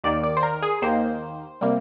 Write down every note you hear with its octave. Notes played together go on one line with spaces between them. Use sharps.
D#2 D#3 A#3 D5
D5
C5
A#4
G#4
D#2 D#3 A#3 C5
C3 G3 A#3